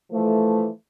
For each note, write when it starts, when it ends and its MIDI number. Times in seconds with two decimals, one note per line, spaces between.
0.11 0.68 52
0.11 0.68 53
0.11 0.68 57